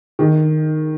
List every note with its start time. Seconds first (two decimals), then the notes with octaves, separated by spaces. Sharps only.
0.19 D#3